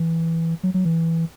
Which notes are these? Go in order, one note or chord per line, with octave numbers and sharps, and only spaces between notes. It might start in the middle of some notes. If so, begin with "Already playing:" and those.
Already playing: E3
F#3
F#3
E3